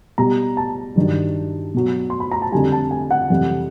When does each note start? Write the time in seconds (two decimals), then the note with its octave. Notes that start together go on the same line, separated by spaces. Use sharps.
0.18 B2 G3 A#5
0.57 A5
0.96 G2 D#3 F#3
1.74 B2 F#3
2.10 C6
2.20 B5
2.32 A#5
2.42 A5
2.52 F2 D3 G3 G#5
2.72 A5
2.91 G#5
3.11 F#5
3.30 F2 C3 E3 G3